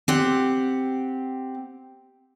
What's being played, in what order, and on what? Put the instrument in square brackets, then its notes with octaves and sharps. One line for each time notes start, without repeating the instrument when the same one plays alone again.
[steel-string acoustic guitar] C4 G4 F#5